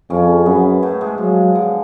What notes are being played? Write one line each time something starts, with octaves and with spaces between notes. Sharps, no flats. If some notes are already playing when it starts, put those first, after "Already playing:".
F2 C#3 C#4
F#2 B2 B3
A2 A3
G#2 G#3
F3 F#3
D3